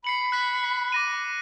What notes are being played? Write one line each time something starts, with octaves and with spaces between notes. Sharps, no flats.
B5 C7 C#7 F#7
F#6 B6
D6 A#6 D#7